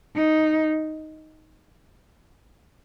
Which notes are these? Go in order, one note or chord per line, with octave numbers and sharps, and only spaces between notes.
D#4